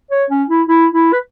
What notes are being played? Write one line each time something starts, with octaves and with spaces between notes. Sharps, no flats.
C#5
C#4
E4
E4
E4
B4